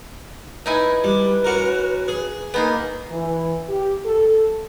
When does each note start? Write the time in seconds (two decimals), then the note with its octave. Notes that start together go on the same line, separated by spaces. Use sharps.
0.66 D#4 E4 B4 G#5
1.04 G3
1.44 C#4 F#4 A#4
2.08 G#4
2.54 A#3 B3 D#4 G#4
3.10 E3
3.69 G4
4.05 A4